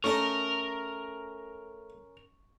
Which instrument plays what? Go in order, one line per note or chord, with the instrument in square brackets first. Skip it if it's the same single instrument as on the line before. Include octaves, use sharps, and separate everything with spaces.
[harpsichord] A3 D#5 A5 [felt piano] C#4 [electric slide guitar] A#4 A#5 [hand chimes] C#6